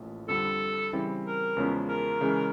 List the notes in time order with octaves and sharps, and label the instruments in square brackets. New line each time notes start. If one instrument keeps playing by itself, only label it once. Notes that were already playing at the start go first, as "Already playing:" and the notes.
Already playing: [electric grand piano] A1 A2 F3 A#3
[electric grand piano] F2 D3 G3 [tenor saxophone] A4
[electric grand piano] C#3 E3 G3 C4 E4
[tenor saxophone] A#4
[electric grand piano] E2 C#3 F3 G#3 C#4
[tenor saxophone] A#4
[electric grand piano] C#3 E3 G#3 C#4